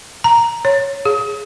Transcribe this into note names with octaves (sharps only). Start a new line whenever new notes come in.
A#5
C#5
G#4